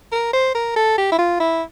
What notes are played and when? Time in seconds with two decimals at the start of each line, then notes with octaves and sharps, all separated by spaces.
0.12 A#4
0.33 C5
0.55 A#4
0.76 A4
0.98 G4
1.12 E4
1.19 F4
1.40 E4